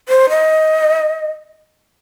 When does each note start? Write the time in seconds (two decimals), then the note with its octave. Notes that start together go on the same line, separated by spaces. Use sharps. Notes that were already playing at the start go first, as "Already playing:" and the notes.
0.09 C5
0.30 D#5